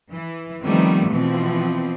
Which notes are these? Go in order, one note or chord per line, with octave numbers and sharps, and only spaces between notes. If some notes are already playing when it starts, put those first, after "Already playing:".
E3
D#3 F3 G3 A3 B3 C4
B2 E3 F3 C4